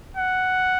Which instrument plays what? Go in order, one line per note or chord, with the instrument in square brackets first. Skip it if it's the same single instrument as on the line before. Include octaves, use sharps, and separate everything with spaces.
[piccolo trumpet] F#5